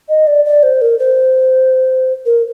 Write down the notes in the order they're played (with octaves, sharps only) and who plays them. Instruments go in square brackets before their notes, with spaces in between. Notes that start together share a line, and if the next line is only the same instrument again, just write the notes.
[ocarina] D#5
D5
D5
C5
A#4
C5
A#4